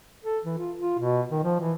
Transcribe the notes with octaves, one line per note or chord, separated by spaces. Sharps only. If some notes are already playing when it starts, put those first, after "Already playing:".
A4
E3
F4
F4
B2
D#3
F3
E3